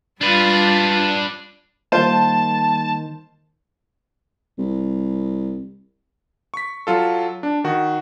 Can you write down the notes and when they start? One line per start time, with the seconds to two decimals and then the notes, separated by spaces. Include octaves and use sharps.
0.21 G3 D4 F4 B4
1.92 D#3 G3 A#3 F4 C5 A5
4.58 C2
6.54 C#6 B6
6.87 F#3 F4 A4
7.43 D4
7.64 D#3 F#4